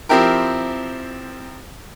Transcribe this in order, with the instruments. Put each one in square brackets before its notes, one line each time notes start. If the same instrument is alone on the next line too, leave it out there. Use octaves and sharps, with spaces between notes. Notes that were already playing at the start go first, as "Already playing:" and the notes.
[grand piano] F3 C4 E4 G4 A#4